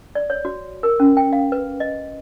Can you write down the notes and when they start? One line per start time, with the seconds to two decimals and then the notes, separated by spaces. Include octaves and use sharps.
0.15 D5
0.30 C#5
0.45 F#4
0.83 A#4
1.00 C#4
1.17 G5
1.33 F5
1.52 B4
1.80 D#5